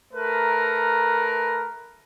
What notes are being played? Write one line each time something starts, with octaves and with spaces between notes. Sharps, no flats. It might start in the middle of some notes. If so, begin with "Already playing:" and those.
A3 A#4 B4 A#5